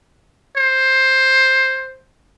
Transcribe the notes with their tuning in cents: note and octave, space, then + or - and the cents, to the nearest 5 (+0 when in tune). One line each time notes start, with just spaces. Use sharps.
C5 +10